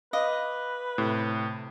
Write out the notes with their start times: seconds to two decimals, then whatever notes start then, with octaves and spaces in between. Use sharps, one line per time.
0.13 B4 D#5 F5 D6 F6
0.98 A2 C3